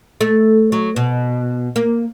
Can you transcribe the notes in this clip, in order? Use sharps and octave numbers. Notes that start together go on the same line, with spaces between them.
A3
F#3
B2
A#3